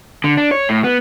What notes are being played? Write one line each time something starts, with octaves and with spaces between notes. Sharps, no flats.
D3
D4
C#5
A2
B3